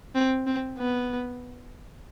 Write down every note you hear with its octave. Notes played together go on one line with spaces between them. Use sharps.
C4
C4
B3